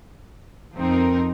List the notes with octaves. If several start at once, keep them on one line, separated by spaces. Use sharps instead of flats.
F2 F3 C4 D#4 A#4